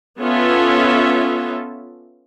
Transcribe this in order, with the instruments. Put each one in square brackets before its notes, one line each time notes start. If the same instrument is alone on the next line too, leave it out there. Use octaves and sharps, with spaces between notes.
[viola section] B3 C#4 F4 A4 E5